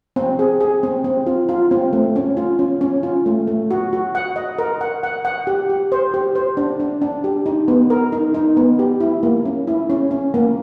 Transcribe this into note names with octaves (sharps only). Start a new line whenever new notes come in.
C4
G#4
G#4
C4
C4
F4
F4
C4
A3
C#4
F4
C#4
C#4
F4
A3
A3
F#4
F#4
F#5
D#5
A#4
F#5
F#5
F#5
G4
G4
C5
G4
C5
D4
D4
D4
G4
D#4
B3
A#4
D#4
D#4
B3
G4
E4
A#3
C#4
E4
C#4
C#4
A#3